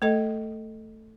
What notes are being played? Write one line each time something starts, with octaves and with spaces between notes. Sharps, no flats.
A3 A4 D#5